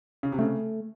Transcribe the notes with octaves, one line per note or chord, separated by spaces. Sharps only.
C#3
C3
C#3 A3